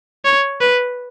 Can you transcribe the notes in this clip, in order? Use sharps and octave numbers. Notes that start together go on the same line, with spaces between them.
C#5
B4